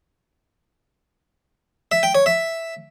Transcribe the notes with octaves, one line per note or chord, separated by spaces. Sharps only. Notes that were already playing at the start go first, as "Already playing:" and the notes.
E5
G5
C#5
E5